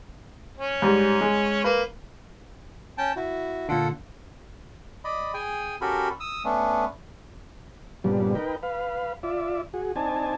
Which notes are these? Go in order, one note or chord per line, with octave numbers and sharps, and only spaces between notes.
C#4
G#2 G3
G#3
A#3 B4
C#4 G5 A5
E4 F#4
A#2 D3 F4 A4 F#5
D5 D#5 B5
G#4 G5 G#5
C#4 F#4 G4 A4 A#4 B5
D#6 E6
A3 B3 C#4 D4
G2 A#2 C#3 G3 B3 D4
D#4 A#4 B4 G5
B4 F5
F4 D5 E5
F#4 G#4
C4 D4 D#4 G#5 A5